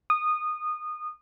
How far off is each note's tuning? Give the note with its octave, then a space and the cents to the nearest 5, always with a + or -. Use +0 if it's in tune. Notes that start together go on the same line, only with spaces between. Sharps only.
D#6 -20